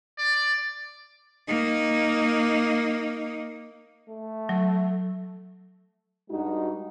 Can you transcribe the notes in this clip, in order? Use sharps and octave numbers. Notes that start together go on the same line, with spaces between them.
D5
A#3 D#4
A3
F#3
G2 G#3 D#4 F#4